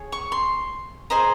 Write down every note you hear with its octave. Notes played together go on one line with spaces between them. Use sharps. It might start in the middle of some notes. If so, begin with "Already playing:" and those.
Already playing: G#4 C#5
C#6
C6
G#4 C5 D#5 A#5